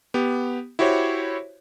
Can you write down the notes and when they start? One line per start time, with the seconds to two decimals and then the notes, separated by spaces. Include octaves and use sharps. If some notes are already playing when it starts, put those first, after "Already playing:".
0.14 B3 G4
0.79 E4 F#4 G4 C5 C#5